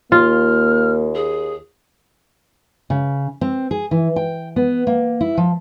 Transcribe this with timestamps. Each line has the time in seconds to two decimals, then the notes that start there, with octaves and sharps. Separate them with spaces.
0.12 D#2 A#3 F4 F6
1.15 G#4
2.90 C#3
3.41 C4
3.71 G#4
3.91 E3
4.16 G5
4.56 B3
4.87 A#3
5.21 E4
5.37 F3